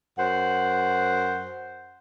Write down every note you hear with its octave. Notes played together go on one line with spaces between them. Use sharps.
F#2 C5 F#5